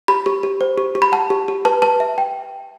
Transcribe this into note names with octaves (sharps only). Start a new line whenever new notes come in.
G4 B5
G4
G4
C5
G4
G4
B5
F#5 A5
G4
G4
B4 A5
B4 A5
E5
G5